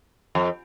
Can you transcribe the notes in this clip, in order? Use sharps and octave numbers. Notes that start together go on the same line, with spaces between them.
F2